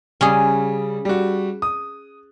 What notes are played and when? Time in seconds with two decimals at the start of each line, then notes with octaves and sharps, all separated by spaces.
0.21 C#3 G3 C#4 G#4 D#6
1.05 G3 F#4
1.62 D#6